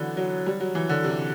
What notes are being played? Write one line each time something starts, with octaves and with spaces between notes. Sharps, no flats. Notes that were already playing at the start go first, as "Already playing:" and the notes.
Already playing: D3 E3 F#3 B3
F#3
G3
F#3
E3
D3
C3